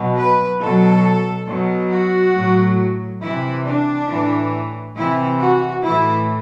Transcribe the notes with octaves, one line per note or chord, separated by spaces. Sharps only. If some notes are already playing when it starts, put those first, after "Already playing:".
Already playing: B2 F#3
B4
B2 F#3 A4
B2 F#3
F#4
A2 F#3
C3 E3 E4
D4
A2 E3
C3 E3 E4
F#4
A2 E3 E4